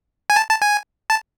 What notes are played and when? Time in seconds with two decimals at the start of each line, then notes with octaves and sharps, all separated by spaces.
0.30 G#5
0.36 A5
0.49 A5
0.62 G#5
1.10 A5